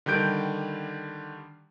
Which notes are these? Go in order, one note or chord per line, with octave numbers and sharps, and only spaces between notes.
D3 D#3 G3 G6 D7